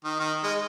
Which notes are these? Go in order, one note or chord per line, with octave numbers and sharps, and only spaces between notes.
D#3
D#3
G#3